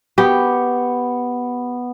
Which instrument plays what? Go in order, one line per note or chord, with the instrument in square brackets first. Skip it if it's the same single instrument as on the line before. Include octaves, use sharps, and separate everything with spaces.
[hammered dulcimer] B3 C#6 [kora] G4